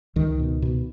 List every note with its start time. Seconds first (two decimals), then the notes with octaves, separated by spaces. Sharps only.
0.16 C#2 D#3
0.39 B2
0.62 B2